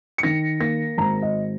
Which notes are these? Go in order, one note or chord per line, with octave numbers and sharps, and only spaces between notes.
C#7
D#3 A#6
A#3 A#6
G#1 A#5
D#5